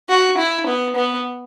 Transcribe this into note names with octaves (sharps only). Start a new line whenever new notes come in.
F#4
E4
B3
B3